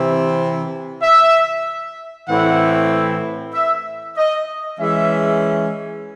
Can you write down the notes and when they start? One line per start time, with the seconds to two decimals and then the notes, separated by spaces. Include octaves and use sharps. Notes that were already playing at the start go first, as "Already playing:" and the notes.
Already playing: C3 E3 C4 E4
1.02 E5
2.28 A2 E3 C4 E4 F#5
3.54 E5
4.17 D#5
4.80 E3 G#3 C#4 E5